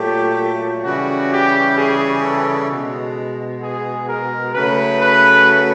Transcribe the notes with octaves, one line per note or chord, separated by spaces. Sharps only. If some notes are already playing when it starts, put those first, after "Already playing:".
Already playing: A#2 F#3 A3 G4
C#3 E3 G3 F#4
G4
G#4
A4
B2 G#3
G#4
A#4
C#3 F#3 A3 B4
B4